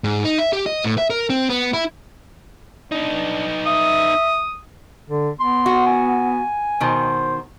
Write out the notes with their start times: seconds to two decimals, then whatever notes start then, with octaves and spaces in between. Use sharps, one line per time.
0.04 G#2
0.24 D#4
0.38 E5
0.53 G4
0.66 D#5
0.84 A2
0.98 E5
1.10 A#4
1.30 C4
1.49 B3
1.73 E4
2.92 B3 D4 D#4
3.67 E5 D#6
5.08 D3
5.40 B3 C6
5.66 F#4
5.87 G#5
6.80 B2 D#3 C5